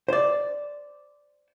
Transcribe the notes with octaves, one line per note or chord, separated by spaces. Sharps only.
C5 D5